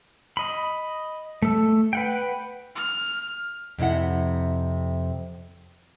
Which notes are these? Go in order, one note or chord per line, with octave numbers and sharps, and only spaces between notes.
D#5 B5
A3 A4
B4 F#5 G5
F6
F2 C3 E4 F#5